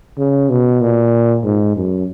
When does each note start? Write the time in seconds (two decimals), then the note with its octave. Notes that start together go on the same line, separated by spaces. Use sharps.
0.18 C#3
0.50 B2
0.81 A#2
1.44 G#2
1.76 F#2